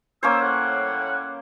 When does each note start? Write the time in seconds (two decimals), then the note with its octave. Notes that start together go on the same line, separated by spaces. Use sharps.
0.23 A#3 C#4 C5 E6
0.41 A2 G3 F#5